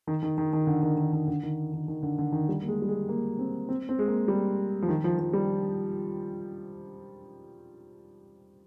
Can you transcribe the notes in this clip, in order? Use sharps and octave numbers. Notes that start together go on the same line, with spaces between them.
D#3
D#3
D#3
D#3
D3
D#3
D#3
D#3
D3
D#3
D#3
D#3
D3
D3
D#3
G3
A#3
G#3
G3
G#3
A#3
C4
C4
C4
G#3
A#3
G3
F3
D#3
F3
F3
G3